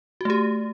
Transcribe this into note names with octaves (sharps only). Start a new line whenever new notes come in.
A3 F#4 G4